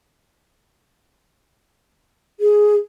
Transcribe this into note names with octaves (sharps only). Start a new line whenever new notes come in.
G#4